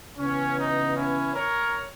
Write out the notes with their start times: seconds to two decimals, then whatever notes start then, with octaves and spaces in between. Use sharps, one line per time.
0.18 C#3 E3 B3 C#4
0.57 D#4
0.96 C#4 E4
1.35 A#4 C#5